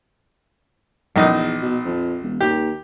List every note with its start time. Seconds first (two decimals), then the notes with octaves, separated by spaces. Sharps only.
1.16 A#1 E2 D#4
1.62 B2
1.85 F2
2.22 E1
2.40 D#2 G4